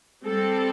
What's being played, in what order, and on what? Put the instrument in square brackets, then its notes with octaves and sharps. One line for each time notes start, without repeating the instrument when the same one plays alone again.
[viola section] G3 C4 A4